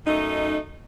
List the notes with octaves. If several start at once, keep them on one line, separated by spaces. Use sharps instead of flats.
F#2 A3 D#4